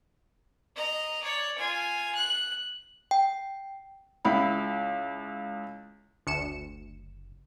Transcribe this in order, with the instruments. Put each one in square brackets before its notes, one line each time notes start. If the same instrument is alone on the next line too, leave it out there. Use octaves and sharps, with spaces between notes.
[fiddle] D#5 A#5
C#5 D5
F4 G#5
F#6
[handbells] G5
[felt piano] C#2 E4 B5
[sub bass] F#1 [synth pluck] D2 C#7 E7